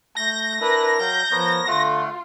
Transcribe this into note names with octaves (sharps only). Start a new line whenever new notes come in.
A3 G6 A#6
D4 E4 A#4 B4
F#3 F5 G5 G6
F3 B3 A#4 C#5
D3 A3 F4 F#5